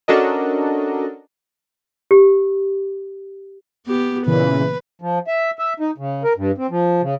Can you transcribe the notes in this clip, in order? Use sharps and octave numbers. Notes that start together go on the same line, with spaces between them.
C#4 D4 F#4 A4 A#4 D#5
G4
B3 G4
A#2 C#3 E3 B4
F3
E5
E5
D#4
C#3
A#4
G2
C4
F3
C#3